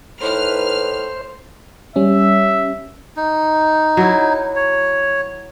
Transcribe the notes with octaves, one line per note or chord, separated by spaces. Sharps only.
A2 D#4 E4 B4 C5 F6
G3 C#4 E5
D#4
F#3 E4
C#5